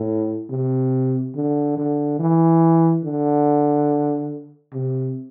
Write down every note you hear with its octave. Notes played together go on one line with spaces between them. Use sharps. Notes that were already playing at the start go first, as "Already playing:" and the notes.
Already playing: A2
C3
D3
D3
E3
D3
C3